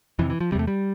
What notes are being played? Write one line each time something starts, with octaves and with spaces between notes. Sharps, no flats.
F2 C3 E3
E3
F3
E2 C3 G3 A3
G3